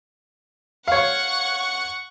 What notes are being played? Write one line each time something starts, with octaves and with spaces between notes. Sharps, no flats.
C#5 F5 F#5 C#6